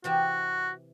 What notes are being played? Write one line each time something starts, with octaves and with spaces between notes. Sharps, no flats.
C3 E3 F#4 G4